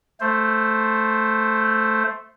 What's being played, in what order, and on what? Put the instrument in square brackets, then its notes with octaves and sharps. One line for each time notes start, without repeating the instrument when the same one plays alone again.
[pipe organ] A3 C5